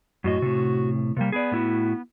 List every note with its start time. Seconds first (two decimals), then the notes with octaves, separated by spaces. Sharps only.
0.24 F#2 A2 F#4 D#5
0.42 A2 C3
1.17 C3 G3 A#3
1.32 B3 G#4 D5
1.52 A2 E4 F#4